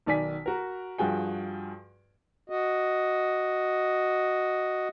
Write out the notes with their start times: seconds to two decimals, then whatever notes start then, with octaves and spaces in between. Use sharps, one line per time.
0.06 B1 D#3 D5 G#5 B6
0.46 F#4 A#4
0.98 G2 F3 F#4 G#4 G5
2.50 F#4 D#5